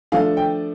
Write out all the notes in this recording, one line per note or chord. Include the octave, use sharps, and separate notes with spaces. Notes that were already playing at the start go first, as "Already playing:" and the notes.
F3 A3 D4 F5
G5